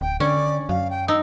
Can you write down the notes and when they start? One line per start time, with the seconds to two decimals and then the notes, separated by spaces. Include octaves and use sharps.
0.01 D1 G5
0.20 D3 C#4 D5
0.69 F#2 F5
0.90 G5
1.08 D#4 E6